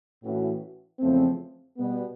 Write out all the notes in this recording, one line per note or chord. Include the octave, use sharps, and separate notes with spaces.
A2 E3 A3 C#4 F#4
E2 C#3 F3 A3 C4
B2 G3 B3